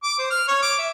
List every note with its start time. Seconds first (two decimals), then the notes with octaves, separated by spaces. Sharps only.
0.03 D6
0.18 C5
0.31 F6
0.48 C#5
0.63 D6
0.78 E5